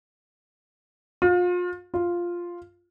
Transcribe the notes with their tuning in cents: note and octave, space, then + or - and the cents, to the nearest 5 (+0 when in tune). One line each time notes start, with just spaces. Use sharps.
F4 +35
F4 +0